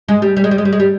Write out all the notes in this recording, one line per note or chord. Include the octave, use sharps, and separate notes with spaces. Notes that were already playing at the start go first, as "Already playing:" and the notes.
G#3
G3
G3
G#3
G3
G#3
G3
G#3
G3